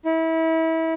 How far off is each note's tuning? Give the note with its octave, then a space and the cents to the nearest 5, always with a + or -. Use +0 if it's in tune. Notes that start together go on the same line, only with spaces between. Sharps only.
E4 -30